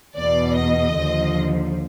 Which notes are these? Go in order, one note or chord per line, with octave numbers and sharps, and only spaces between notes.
E2 B2 D5
D#5
D#2 D3 F3